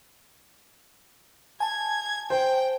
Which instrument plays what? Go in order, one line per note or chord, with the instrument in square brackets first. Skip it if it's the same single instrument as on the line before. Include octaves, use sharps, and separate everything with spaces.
[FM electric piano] G#5 A5 [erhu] G#6
[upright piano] C5 [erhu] G5